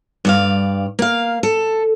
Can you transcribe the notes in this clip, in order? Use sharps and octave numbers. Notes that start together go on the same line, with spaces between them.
G2 D5 F5
A#3 F5
A4